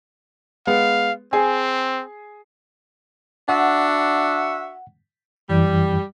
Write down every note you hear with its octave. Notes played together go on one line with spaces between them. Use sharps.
G#3 B3 F5
C4 G#4 G#5
D4 F#4 E5 F#5
F#2 E3 G3